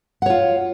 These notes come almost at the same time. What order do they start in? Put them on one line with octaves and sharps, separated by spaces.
F#5 C#5 F4